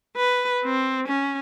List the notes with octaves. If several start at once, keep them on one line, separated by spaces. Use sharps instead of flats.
B4
C4
C#4